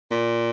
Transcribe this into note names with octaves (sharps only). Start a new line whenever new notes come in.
A#2